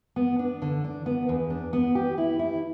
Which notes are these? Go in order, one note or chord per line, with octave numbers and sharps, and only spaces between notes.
B3
D4
D3
D4
B3
E2
D4
B3
G4
E4
E4